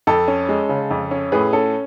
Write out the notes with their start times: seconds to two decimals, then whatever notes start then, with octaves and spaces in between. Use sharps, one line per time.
0.07 F2 A4
0.28 C#4
0.49 G#3
0.69 C#3
0.91 F2
1.11 C#4
1.32 A2 G#4 B4
1.53 C#4 A4